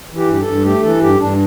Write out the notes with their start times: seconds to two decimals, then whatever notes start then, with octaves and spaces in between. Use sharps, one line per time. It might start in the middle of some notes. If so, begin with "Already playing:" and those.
0.11 E3
0.17 G4
0.28 G2 G4
0.41 A4
0.47 G2
0.65 A3 G4
0.83 E3 A4
1.02 G2 G4
1.20 G2 D4